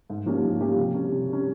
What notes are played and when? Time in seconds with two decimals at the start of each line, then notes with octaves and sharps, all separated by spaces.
0.10 G#2
0.26 F3 A#3 C#4 G4
0.44 G#2
0.60 F3 A#3 C#4 G4
0.78 C3
0.94 G3 C#4
1.12 C3
1.28 G3 C#4